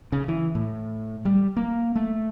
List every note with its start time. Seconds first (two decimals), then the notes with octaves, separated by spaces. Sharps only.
0.12 C#3
0.28 E3
0.55 A2
1.25 G3
1.57 A#3
1.95 A3